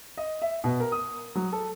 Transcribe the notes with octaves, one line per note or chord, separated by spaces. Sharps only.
D#5
E5
B2
A#4
D#6
F#3
A4